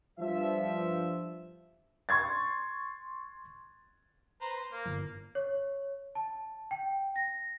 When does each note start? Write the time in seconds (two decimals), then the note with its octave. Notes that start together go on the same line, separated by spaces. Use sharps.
0.19 G2 F3 E5
2.09 C6 C#6 G#6 A6
4.41 B4 C5 A#5
4.72 A#3
4.86 G1
5.35 C#5
6.15 A5
6.71 G5
7.16 A#6